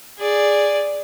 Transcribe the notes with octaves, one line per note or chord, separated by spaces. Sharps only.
G#4 D5